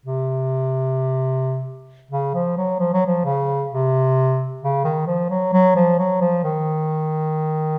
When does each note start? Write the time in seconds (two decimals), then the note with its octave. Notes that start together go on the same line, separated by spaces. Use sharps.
0.06 C3
2.11 C#3
2.34 F3
2.57 F#3
2.79 F3
2.93 F#3
3.06 F3
3.25 C#3
3.71 C3
4.62 C#3
4.84 D#3
5.07 F3
5.30 F#3
5.53 F#3
5.76 F3
5.99 F#3
6.21 F3
6.44 D#3